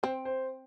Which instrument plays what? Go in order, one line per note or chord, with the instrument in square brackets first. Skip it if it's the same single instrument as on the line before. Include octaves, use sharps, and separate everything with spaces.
[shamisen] C4 [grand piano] C5
[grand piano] C5